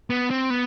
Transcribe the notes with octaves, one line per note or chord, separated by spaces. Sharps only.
B3
C4
B3